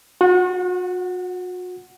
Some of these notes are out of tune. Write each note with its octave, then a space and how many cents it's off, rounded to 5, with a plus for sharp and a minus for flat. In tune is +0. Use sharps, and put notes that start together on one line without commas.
F#4 -40 F#5 +0